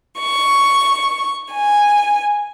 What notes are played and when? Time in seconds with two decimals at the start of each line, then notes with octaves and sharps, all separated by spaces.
0.18 C#6
1.51 G#5